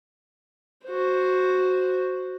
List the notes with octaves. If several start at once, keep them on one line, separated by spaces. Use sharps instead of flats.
F#4 C5